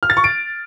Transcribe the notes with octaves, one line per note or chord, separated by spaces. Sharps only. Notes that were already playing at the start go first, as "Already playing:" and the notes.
F6
A6
C#6
D7